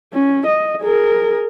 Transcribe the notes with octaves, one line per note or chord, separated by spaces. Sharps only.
C#4
D#5
G#4 A#4